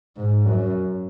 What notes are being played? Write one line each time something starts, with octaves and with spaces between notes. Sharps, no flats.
G#2
F#2